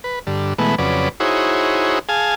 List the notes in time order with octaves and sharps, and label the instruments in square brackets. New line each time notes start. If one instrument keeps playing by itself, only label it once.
[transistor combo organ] B4
G2 D3
B2 E3 G#3 A3 B3
F2 C#3 F#3 B4 D5
D#4 E4 F#4 G#4 C5 C#5
G#4 F5 G#5 A5